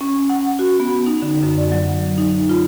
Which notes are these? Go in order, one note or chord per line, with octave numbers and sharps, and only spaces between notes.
C#4
F#5
F#4
B3
D#4
D3
F#2
D5
F#3
D#4
F4